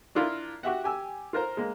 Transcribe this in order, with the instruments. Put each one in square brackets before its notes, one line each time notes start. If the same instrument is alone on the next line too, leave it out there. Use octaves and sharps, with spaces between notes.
[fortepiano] D4 E4 F4 A#4
F#4 G4 E5 F#5
G4 G#5 E6
F4 A#4 C5 A#5
G#3 A#3